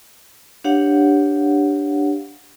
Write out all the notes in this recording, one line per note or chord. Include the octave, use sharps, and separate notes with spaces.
D4 G4 C#5 F5 F#5